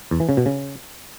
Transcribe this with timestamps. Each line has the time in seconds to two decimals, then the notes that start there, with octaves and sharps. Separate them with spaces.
0.11 E2
0.20 E3
0.29 C#3
0.37 B2
0.46 C#3